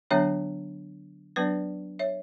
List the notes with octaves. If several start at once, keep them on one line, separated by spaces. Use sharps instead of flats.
D3 F#3 B3 D4 C#5 E5
F#3 B3 D4 B4 D5
C#5 E5